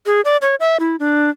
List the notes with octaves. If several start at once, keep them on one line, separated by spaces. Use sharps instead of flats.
G#4
D5
C#5
E5
E4
D4